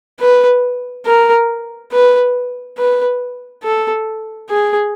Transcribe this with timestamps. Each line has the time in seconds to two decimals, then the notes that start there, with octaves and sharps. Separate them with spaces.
0.20 B4
1.06 A#4
1.92 B4
2.78 B4
3.63 A4
4.50 G#4